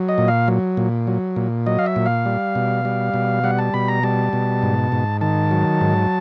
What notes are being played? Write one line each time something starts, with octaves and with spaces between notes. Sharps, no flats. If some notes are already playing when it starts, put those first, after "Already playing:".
Already playing: F#3
D#5
A#2
F5
F#3
A#2
F#3
A#2
F#3 D#5
F5
E5
A#2
F5
G3
B2
G3
B2
G3 F#5
A5
B2 B5
A#5
G3 A5
B2
G#2
G#2
D#3 A5
F#3
G#2